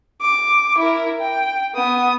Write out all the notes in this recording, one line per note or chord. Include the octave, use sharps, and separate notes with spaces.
D6
E4 A#4
G5
B3 D#6